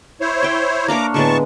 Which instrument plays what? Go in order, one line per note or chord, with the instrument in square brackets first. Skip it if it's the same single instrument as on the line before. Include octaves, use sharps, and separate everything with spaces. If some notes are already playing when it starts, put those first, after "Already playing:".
[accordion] E4 C5 C#5
[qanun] E5 G5
[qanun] A#3 D4 C#5 [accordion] A#5 D6
[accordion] A2 A5 C#6 [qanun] D3 G#3 B3